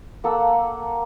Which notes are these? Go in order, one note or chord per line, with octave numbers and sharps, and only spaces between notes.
A#3 A4 F#5 E6